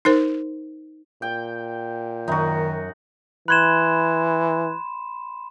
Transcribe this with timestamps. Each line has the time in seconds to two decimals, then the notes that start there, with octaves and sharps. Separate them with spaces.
0.05 D#4 A#4 C5
1.22 A#2 G5
2.28 F#2 D#3 D#4 F#4
3.48 E3 B5 C6 F#6 G#6 E7